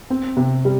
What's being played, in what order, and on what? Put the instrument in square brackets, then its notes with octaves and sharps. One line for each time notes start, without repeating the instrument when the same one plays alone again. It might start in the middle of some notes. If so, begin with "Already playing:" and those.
[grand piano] C4
C3
G3